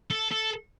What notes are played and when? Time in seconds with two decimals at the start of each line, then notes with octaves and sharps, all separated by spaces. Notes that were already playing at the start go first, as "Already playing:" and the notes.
0.10 A4
0.31 A4